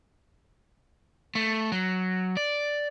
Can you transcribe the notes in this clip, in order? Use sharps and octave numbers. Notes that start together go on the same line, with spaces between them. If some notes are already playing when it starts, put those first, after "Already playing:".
A3
F#3
D5